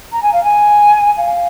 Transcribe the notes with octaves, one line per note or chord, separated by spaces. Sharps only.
A#5
G#5
F5
G#5
F5